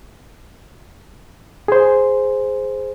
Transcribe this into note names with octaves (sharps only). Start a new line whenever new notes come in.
G#4 C5